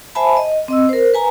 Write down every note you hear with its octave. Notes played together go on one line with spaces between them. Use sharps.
C5 E5 G#5 A5 B5
D#5
C4 D#5 E6
A#4 C5
B4 G#5 A#5